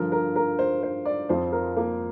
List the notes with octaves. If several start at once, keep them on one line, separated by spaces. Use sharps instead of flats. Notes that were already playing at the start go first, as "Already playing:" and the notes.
Already playing: G2 D3 F3 A#4
A#4
A#4
C5
C5
D5
F2 F3 C5
A#4
A#3